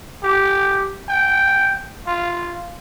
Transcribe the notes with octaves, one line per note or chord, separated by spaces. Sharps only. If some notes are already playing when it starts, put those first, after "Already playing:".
G4
G5
F4